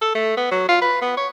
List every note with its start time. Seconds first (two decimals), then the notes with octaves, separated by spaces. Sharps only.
0.01 A4
0.15 A3
0.37 B3
0.51 F#3
0.69 F4
0.82 B4
1.02 B3
1.17 C#5